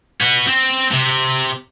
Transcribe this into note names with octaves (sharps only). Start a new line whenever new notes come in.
B3 F#4
C4
C3